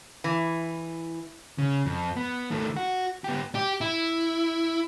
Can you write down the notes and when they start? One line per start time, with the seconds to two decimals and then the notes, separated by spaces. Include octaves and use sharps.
0.24 E3
1.58 C#3
1.86 F2
2.16 B3
2.51 D#3 A3
2.76 F#4
3.24 B3 G4
3.55 G4
3.81 E4